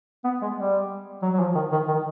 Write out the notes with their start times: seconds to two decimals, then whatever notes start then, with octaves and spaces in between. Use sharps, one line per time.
0.24 B3
0.42 G#3
0.57 G3
1.22 F#3
1.33 F#3
1.40 F3
1.55 D#3
1.72 D#3
1.88 D#3